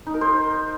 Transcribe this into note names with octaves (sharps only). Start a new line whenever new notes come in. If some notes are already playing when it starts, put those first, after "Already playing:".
D#4
A#4
C5